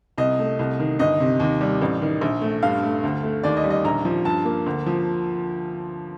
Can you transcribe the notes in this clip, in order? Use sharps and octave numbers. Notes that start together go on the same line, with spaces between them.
C2 D#5
A3
C2
D#3
G1 D#5
C3
D#2
G3
A1
D#3
A#1
A3
G2 F5
A3
D2
A3
D#2 D5
D#5
G3
D#5
A#1 A#5
F3
G2 A5
A#3
D2
F3